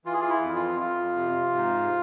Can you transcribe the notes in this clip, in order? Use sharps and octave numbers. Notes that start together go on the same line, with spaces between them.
E3 F4
G#4
F4
E4
F2
F4
F2 F4
C3
G#2